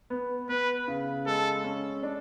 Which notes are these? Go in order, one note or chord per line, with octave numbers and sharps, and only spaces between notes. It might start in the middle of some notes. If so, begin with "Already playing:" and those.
B3
B3 B4
C#3
G#3 A4
C#4
D4